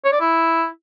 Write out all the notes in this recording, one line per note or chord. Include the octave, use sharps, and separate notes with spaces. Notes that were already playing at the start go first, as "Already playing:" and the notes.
C#5
D5
E4